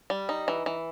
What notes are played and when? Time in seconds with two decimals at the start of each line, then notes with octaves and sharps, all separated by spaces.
0.10 G3
0.29 D#4
0.48 E3
0.66 E3